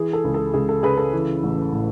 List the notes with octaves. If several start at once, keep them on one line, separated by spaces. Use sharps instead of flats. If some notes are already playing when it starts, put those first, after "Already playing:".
Already playing: E3 G#4
A4
C#2
A4
C#2 G#4
A4
C#3 G#4 B4
A4
E3
A1
A2